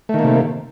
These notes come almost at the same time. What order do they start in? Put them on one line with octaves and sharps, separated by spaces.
A3 D#3 A#3 C3